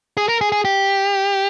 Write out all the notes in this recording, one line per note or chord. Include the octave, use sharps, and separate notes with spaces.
G#4
A#4
G#4
G#4
G4